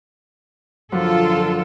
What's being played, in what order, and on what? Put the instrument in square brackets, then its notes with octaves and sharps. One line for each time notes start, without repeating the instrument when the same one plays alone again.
[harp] F#2 F3 [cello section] D3 F4 A4